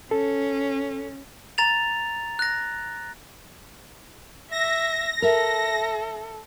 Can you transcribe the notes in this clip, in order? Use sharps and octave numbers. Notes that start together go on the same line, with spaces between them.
C#4 A4
A#5 A6 F7
F#6 A#6
E5 A#6
A4 A#4 E5